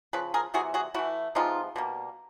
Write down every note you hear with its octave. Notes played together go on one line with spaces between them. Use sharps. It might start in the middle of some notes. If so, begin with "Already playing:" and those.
C#3 F3 B4
G#4 A#4
C3 E3 G3 F#4 G#4
F#4 G#4
E3 A3 E4 F#4
C3 F3 G#3 B3 D#4 F4
B2 G3 A#3